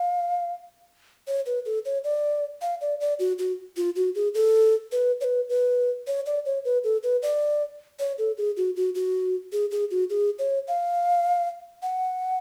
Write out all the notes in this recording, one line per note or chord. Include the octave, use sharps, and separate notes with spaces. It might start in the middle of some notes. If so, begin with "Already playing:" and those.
Already playing: F5
C#5
B4
A4
C#5
D5
F5
D5
D5
F#4
F#4
F4
F#4
G#4
A4
B4
C#5
B4
B4
C#5
D5
C#5
B4
A4
B4
D5
C#5
A4
G#4
F#4
F#4
F#4
G#4
G#4
F#4
G#4
C#5
F5
F#5